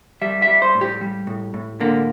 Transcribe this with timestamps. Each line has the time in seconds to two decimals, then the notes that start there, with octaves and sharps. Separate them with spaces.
0.22 G3 E5
0.42 E5
0.48 G3
0.62 C5
0.75 A2
0.81 G4
1.01 G3
1.27 A2
1.54 A2
1.80 D3 A#3